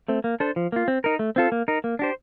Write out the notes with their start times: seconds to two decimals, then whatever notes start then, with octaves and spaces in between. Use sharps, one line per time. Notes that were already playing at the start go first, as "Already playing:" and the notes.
0.08 A3 C4
0.24 A#3
0.40 D4 A4 C5
0.56 F3
0.72 A#3 F4
0.88 C4
1.04 D#4 A#4
1.19 A3
1.36 C4 F4 A4
1.52 A#3
1.68 D#4 A#4
1.84 A#3
1.99 D4 G4 C5